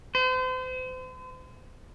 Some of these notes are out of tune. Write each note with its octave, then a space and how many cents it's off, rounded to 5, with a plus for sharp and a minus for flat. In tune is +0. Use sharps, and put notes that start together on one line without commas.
C5 -40